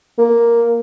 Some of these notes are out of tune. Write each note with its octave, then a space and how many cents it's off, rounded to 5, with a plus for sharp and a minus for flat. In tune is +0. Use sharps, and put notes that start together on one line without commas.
A#3 +0